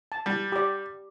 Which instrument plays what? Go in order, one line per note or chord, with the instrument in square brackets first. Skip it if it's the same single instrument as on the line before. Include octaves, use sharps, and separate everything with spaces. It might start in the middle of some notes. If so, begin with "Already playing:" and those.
[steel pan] A5
[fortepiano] G3
[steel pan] G4 D5